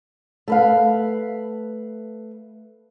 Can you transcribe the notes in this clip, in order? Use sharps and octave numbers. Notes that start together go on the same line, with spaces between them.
A3 B4 F5